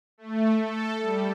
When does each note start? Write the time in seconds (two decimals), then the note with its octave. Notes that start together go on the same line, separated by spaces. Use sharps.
0.18 A3
0.57 A4
1.01 G3